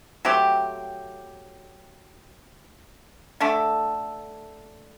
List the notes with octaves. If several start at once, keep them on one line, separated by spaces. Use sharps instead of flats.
F#3 A3 C4 G4
D3 A3 D4 A4